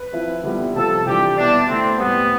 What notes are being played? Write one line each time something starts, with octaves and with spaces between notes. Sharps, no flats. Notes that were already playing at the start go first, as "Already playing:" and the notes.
Already playing: B4
F3 C4 E4
D3 G3 B3 E4
C3 F3 C4 A4
C3 E3 G3 D4 G4
B2 B3 D4 E4
D3 A3 C4 E4
A2 G3 B3 C4